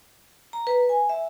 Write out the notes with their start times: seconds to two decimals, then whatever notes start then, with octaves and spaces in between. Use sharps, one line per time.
0.53 A#5
0.67 B4
0.89 G#5
1.09 E5